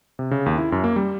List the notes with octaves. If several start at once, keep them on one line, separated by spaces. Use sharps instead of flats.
C3
C#3
D#2
E4
F#2
A#3
G3